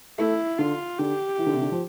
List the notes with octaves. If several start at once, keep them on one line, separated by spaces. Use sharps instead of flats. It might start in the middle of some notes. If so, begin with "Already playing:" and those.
A3 E4
D3 F4
D3 G4
E3
D3
C3
D3
F3